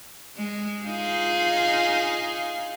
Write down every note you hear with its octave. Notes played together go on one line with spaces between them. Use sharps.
G#3
D#4 F4 G#4